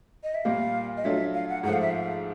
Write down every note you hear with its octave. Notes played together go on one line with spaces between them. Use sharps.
D#5
E5
A#2 G3 A#3 F5
D#5
F#3 A3 D4 F4 E5
F5
F#5
G#2 F3 A3 F#5
F5
E5
F5